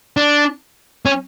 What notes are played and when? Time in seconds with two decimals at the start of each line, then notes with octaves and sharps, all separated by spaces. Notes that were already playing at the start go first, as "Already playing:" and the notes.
0.17 D4
1.06 C#4